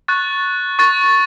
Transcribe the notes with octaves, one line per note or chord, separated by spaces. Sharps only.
C#6 F#6 A6
C#6 F#6 A6